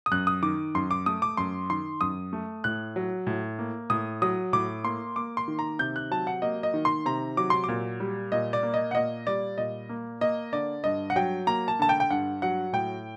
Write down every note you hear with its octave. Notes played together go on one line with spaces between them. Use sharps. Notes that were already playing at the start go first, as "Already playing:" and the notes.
D#6
F#2 F#6
D#6
D#3 D6
F#2 C6
D6
A3 D#6
D6
F#2 C6
D#3 C6
F#2 D#6
A3
A2 F#6
F#3
A2
A#3
A2 D#6
F#3 D#6
A2 D6
A#3 C6
A#3 D6
C6
D#3
A#5
C3 G6
F#6
F#3 A5
F#5
A#3 D#5
D#5
D#3
C6
C3 A#5
F#3 D6
C6
A#2 D6
G3
A#2 D#5
D5
A#3
D#5
F#5
A#2 D#5
G3 D5
A#2 D#5
A#3
A#3 D#5
D3 D5
G2 D#5
F#5
F#3 G5
A#3 A#5
A5
D3 A5
G5
G5
G2 F#5
F#3 F#5
A2 G5